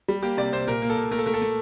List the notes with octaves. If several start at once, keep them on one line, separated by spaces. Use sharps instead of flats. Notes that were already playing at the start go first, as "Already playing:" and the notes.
G3
A#3 G4
C3 D5
C3 C5
A#2 A#4
A#3
A4
A#2
A3 A#4
A4
A3 A#4
A4
A3